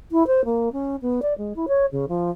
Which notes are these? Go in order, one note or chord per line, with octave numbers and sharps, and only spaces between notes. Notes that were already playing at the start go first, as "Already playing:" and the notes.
E4
C5
A#3
C#4
B3
D5
G#3
E4
C#5
C#3
F3